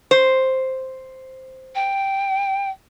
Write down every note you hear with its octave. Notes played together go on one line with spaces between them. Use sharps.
C5
G5